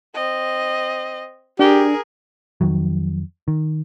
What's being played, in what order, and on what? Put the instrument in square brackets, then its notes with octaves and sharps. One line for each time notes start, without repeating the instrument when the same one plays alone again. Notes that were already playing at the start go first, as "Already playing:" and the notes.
[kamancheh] C4 D#5
[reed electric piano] D4 [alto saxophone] G4 [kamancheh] G#4 A#4
[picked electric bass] F2 D#3 F#3
D#3